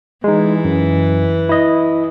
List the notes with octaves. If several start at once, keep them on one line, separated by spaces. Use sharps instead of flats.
E3 G#3 D#4
F#2
E4 D#5